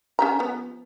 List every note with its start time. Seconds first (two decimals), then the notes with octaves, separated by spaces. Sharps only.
0.19 C#4 G4 A#5
0.39 F3 B3